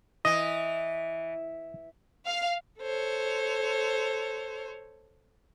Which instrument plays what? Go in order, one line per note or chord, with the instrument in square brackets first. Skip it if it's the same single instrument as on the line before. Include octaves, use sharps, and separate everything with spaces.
[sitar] E3 [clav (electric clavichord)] D#5
[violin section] F5
[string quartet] A4 C5 C#5